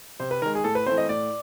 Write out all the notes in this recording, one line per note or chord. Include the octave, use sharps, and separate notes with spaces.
C3 C5
B4
D#3 G#3 A#4
G#4
A2 A4
B4
E3 A3 C4 C5
D#5
A2 D5